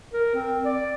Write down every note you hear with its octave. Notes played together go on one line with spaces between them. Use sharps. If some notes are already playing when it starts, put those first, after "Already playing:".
A#4
C4
D5